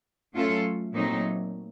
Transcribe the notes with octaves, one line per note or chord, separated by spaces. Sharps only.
F#3 A3 C#4 F4 A4
A#2 F#3 A3 C4 D#4